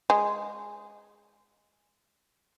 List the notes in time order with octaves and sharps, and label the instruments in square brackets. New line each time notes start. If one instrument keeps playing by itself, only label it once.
[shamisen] G#3